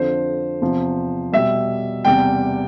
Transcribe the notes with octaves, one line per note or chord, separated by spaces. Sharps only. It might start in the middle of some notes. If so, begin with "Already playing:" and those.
Already playing: F2 D3 F3 C5
E2 C3 F3
B2 G3 E5
E2 C3 G3 G5